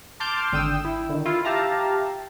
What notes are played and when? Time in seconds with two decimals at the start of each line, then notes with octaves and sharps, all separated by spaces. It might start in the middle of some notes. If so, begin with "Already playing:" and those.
0.20 A5 C6 D6 F6 G6
0.52 G#1 D3 G5 D#6 E6
0.85 E4
1.09 D3 D#3
1.25 E4 F4
1.44 G4 E5 F5 A5 A#5